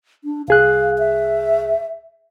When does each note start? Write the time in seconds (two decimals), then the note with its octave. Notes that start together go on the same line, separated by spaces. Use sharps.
0.24 D4
0.48 C2 G#4 F5 F#6
0.98 E5